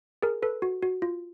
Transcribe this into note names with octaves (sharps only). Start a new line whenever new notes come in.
G#4 A#4
A4 B4
F#4
F#4
F4